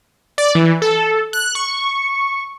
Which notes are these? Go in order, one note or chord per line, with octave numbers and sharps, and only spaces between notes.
D5
E3
A4
F#6
C#6